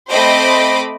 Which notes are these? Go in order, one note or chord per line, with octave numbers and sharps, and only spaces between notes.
A3 C4 C5 D#5 B5 D6